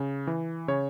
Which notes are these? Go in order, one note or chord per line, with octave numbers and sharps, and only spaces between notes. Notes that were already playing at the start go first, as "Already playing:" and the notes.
Already playing: C#3
E3
C#3 C#5